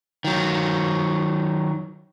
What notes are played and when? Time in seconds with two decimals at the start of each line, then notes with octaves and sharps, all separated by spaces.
0.24 D#3 F#3